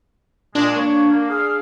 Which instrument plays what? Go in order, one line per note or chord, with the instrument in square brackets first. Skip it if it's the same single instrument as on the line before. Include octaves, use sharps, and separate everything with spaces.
[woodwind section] A#2 G#3 [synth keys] D4
[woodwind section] A#3 C#5
A#3
G#4 F5